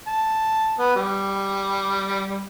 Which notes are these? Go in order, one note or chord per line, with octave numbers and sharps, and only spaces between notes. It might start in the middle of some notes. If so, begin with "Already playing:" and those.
A5
B3
G3